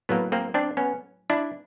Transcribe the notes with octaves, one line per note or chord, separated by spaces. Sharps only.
A2 F#3 A#3 B3
A#3 C4
C4 D4
B3 C#4
D4 E4